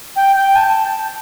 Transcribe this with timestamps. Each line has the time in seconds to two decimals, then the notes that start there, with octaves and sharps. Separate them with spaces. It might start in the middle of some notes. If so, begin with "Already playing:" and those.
0.16 G5
0.36 G5
0.56 A5